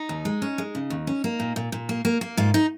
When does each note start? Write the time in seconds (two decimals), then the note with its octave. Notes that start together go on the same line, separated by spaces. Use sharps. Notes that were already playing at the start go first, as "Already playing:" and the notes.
Already playing: D#4
0.09 D#2
0.25 G#3
0.42 C#4
0.58 G#3
0.75 C#3
0.90 D#2
1.07 C#4
1.24 A#3
1.40 A#2
1.56 A#2
1.72 A#2
1.89 A#3
2.05 A#3
2.21 A#3
2.37 G#2 F4
2.54 D#4